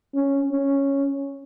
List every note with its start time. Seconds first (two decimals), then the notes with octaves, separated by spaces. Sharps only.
0.15 C#4
0.53 C#4